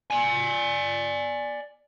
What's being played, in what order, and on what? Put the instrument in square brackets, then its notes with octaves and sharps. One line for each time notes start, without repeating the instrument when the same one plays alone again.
[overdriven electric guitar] D5 G#5